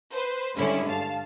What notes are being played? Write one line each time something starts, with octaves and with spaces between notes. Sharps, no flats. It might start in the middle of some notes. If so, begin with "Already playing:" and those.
B4 C5
G2 D3 G#3 C#4 E4
G2 F5 A5